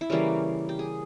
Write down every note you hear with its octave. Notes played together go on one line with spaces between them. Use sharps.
E4
C#3 E3 G3 A#3 C#4
G4
G#4